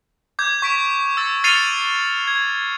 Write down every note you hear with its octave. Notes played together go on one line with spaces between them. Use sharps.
D6 G6 G#6
C#6 B6 D7
E6 A6
F6 A6 C7 C#7 D#7 F7
G#6